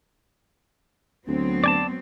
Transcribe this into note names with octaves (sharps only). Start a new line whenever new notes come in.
D2 F#3 B3 C4
D5 G#5 A5